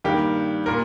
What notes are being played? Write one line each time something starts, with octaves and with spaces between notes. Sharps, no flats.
G2 D#3 A#3 G4
A#2 A#4